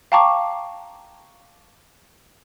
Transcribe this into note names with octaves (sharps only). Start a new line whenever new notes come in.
F5 G5 A5 A#5 C#6 D6